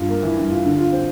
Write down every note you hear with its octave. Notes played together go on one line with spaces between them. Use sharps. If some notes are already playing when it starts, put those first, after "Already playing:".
Already playing: G2 F4
A#3
E3
G2
F4
D3
F4
C4